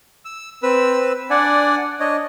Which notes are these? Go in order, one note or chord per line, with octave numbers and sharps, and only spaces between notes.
E6
C4 B4 E6
D4 D5 F#5 G#5
D4 C#5 D#5